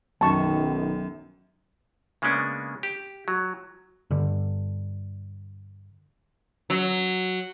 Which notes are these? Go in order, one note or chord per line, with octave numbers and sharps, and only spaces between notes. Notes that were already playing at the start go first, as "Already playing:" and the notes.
B1 F#2 D#3 A5 C#6
C#3 G#3 A#3 B3 C#4 D4
G4
F#3
G2 D3
F#3